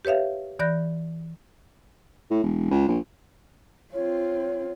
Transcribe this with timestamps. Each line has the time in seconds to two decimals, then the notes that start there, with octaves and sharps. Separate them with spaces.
0.05 G4 B4 C#5 E5 F5
0.59 E3 D5 B5 F#6 G6 A#6
2.31 A2
2.43 E1
2.71 C#2
2.88 A#1
3.93 C4 F4 C#5